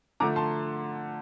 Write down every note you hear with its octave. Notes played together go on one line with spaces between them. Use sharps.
D3 F3 A3 A#5 D6
A5 C6